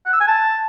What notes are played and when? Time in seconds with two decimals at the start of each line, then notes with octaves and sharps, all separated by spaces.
0.06 F#5
0.13 E6
0.20 G#5
0.27 A5